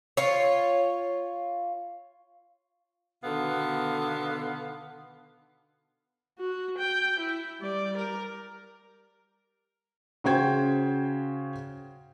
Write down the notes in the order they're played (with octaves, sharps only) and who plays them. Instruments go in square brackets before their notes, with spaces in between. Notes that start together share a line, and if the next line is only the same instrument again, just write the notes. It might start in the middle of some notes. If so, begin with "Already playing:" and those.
[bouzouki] F4 C#5
[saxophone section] B2 D3 D#3 B3 F5
[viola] F#4
G5
E4
G3 D5
A#4
[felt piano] C#3 F#4 C5 G5 G#6